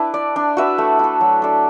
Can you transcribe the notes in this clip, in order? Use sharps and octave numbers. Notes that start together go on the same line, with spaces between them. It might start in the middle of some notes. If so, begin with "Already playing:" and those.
Already playing: D4 E4 B4
D5
D4
F#4 B4 E5
A3
E4 A4
F#3
D4 A4 D5